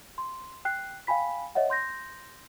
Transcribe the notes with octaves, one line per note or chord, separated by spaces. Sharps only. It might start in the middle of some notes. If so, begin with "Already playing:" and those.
C6
G5 F#6 C7
F5 G5 G#5 B5 B6
C#5 D#5 E5 F#5
C6 G6 A#6